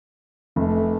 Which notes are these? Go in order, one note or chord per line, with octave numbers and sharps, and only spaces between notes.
F1 A3